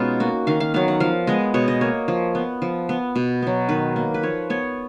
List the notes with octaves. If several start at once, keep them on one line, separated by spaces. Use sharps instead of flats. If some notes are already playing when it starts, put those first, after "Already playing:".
Already playing: B2 G#3 B3 C#4 D#4 F4
A#3 F#4
D#3 F5
F5
F#3 B3 F5
F#5
F3 F5
G#3 B3 D#5
B2 C#5
D#5
A#3 C#5
F3
B3
F3
B3
B2
F#3 B3
D#3 B4
A#3
B4
F3 C#5
B3 C#5